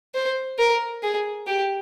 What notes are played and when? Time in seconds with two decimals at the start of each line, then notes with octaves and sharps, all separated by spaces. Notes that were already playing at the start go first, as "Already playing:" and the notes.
0.15 C5
0.59 A#4
1.03 G#4
1.47 G4